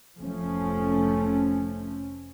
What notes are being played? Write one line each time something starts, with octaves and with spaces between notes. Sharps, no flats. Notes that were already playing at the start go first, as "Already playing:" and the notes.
F1 F3 A3 C#4